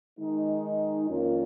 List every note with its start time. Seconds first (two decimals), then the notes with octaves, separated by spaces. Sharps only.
0.16 D#3 G#3 D#4
1.08 F2 D#3 A#3 C#4 F4